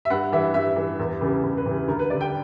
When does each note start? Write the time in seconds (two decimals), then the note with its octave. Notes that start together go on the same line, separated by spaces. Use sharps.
0.05 E5
0.10 G2 F#5
0.32 E3 G3 E5
0.54 G2 E5
0.76 E3 G3
0.99 E2
1.21 C#3 E3 G3
1.43 E2
1.57 B4
1.66 C#3 E3 G3
1.88 D2 A#4
1.99 B4
2.10 G3 D5
2.14 D3
2.21 G5